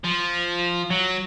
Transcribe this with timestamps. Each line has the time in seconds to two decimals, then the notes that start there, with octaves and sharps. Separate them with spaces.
0.04 F3
0.90 F#3